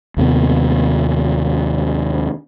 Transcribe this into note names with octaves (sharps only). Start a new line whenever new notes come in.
D#2 C3 B3